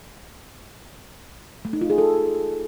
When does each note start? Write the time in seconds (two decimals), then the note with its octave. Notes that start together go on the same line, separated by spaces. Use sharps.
1.65 A3
1.73 D#4
1.81 F4
1.90 G#4
1.98 A4